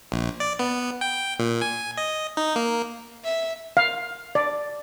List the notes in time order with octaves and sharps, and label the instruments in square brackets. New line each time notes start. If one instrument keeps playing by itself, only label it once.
[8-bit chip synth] A#1
D5
B3
G5
A#2
G#5
D#5
D#4
A#3
[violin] E5
[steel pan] F5
D5